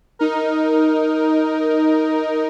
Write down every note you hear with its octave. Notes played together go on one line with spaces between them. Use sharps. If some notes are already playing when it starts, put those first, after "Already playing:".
D#4 A#4